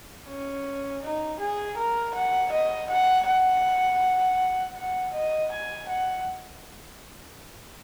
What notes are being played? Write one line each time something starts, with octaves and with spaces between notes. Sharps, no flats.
C#4
D#4
G#4
A#4
F#5
D#5
F#5
F#5
F#5
D#5
G#5
F#5